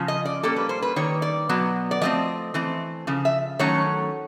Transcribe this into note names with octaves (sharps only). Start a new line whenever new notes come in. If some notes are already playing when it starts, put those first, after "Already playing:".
Already playing: C#3 F3
D#5
D5
A#2 G3 A#3 C#4 A4
B4
C5
B4
D#3 G3 A#3 C#5
D5
B2 F#3 B3
D5
F3 A3 C4 D#5
E3 A3 C4
C#3 F3
E5
D#3 F#3 A3 C#4 C#5